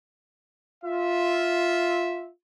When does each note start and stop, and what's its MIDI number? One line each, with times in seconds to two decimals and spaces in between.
0.85 2.29 65
0.85 2.29 76